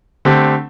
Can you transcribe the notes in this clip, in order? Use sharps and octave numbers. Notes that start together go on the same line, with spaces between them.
D3 A3 C4 G4